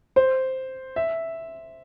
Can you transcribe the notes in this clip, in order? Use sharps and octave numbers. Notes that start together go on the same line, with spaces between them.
C5
E5